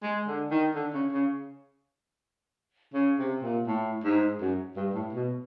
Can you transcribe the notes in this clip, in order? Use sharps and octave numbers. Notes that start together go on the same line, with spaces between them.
G#3
D3
D#3
D3
C#3
C#3
C#3
C3
A#2
A2
G#2
F#2
G2
A2
B2